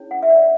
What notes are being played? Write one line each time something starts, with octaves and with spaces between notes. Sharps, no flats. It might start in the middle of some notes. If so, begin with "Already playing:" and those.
Already playing: C#4 E4 G#4 C#5
F#5
E5
D5